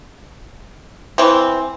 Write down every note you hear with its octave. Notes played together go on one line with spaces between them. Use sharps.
E3 C4